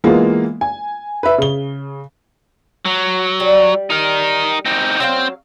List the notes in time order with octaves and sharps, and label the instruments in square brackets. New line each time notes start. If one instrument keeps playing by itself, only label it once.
[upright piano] E3 G#3 A#3 B3 F4
G#5
B4 E5
C#3 G7
[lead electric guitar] F#3
[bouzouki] G3
[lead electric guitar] D#4 A#4
C4 D#4
[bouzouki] F#3 E5 F5 [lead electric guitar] C4 C5